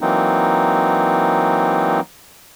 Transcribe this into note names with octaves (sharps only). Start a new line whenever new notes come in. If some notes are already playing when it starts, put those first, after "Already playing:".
E3 F#3 A#3 C4 D#4